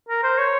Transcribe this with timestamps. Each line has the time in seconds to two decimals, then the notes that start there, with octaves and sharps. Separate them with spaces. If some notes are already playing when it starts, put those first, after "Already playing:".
0.09 A#4
0.24 C5
0.38 C#5